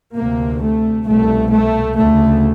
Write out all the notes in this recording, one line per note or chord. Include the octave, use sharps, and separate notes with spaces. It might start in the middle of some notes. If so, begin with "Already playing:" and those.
D2 C3 A#3
A3
C2 B2 A3
A3
D2 C#3 A3